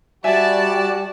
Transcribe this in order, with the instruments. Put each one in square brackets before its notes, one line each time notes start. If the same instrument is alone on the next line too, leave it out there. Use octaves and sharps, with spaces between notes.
[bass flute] G3 [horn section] F#4 [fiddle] D5 A5 [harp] E5 G#5